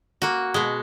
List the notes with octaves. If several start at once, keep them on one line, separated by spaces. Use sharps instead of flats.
A#3 F#4
B2 G#3